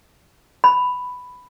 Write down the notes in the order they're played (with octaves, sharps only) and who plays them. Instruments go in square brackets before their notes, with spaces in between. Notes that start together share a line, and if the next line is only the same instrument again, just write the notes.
[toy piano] B5